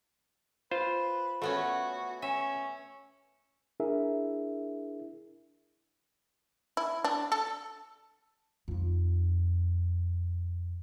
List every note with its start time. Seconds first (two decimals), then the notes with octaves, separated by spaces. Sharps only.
0.71 F4 B4 C5
1.42 A3 B3 C#4 F#4
2.22 C#4 E5
3.80 D4 E4 G#4 A#4 E5
6.77 E4
7.04 D4
7.32 A4
8.68 F2 D#4